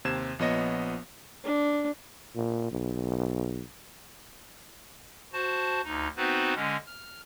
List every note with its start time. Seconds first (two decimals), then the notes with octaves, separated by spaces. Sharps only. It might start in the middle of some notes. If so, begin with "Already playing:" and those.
0.05 D#2 C3 C5 G#6 E7
0.39 A#1 F3 B3 C#5 D#5 A#6
1.44 D4
2.35 A#2
2.72 B1
5.33 F#4 C5 A5
5.84 D2 D#4
6.17 B3 C4 D#4 F#4 B4 C5
6.55 D3 G#3 C#4
6.86 F6